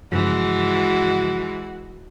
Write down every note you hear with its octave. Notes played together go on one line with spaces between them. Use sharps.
G2 C#3 E3 F3 G#3 F#4